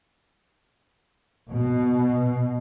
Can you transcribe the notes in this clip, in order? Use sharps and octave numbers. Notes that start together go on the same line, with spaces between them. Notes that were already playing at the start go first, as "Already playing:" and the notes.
B2